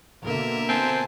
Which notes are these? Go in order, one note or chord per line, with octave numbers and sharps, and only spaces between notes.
B2 D3 A#3 A#4 E5
C4 C5 G#5 A5